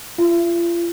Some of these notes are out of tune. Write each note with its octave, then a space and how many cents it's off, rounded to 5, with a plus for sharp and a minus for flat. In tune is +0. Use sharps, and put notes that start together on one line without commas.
F4 -30 E5 +35